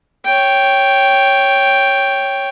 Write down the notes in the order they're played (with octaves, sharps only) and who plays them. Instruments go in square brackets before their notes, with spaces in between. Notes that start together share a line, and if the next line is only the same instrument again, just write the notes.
[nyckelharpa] C#5 G5